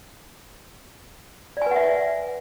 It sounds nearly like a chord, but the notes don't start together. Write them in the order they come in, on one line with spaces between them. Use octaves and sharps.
D5 G#5 B4 F#5 E5